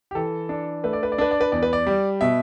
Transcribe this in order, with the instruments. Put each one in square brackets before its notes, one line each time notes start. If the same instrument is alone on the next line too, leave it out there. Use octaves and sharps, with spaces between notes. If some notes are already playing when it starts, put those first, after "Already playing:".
[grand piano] G4
E3 A4
D4
A3 B4
D5
B4
D5
D4 B4
D5
B4
E2 D5
B4
D5
G3
B2 E5